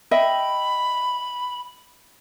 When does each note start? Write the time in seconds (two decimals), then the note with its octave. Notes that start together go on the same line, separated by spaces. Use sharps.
0.11 D#5 E5 G5 B5